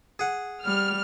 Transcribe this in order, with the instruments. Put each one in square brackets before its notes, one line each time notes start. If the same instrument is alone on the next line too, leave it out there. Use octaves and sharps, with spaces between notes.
[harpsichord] G#4 F#5
[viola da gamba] G3 [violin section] F6